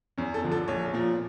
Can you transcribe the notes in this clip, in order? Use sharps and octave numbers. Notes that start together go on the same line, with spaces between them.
E2 C#4
A4
D3 F3
A4
A#1 C#5
A#2 F3